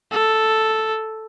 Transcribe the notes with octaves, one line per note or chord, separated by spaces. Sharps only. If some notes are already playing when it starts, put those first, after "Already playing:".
A4